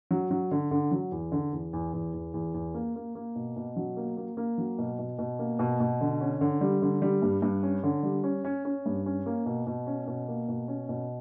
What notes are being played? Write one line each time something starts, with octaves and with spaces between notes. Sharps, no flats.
F#3
F#3
D3
D3
F#3
E2
D3
E2
E2
E2
E2
E2
E2
A#3
A#3
A#3
B2
B2
F#3
A#3
A#3
A#3
F#3
B2
B2
B2
A#3
B2
B2
D3
C#4
D3
G3
D3
G3
G2
G2
C#4
D3
G3
C#4
C#4
C#4
G2
C#4
A#3
B2
B2
C#4
B2
A#3
B2
C#4
B2